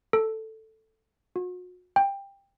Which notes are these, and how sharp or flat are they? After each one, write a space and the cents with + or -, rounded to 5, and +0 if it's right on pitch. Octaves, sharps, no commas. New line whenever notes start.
A4 +5
F#4 -40
G5 +15